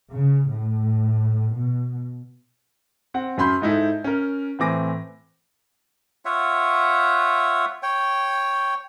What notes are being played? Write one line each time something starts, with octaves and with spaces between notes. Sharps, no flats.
C#3
A2
B2
C4 F#5
F#2 C#4 B5 C6 G6
G#2 D#4 E4 A4
C#4 A#4
A2 E3 C4 G#5 D6 A#6
F4 C#5 E5 F#5
C#5 G5